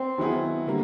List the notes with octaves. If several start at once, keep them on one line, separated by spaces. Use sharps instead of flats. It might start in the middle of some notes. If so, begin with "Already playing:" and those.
Already playing: C4
D#3 F#3 B3 E4 G#4
D3 G3 A#3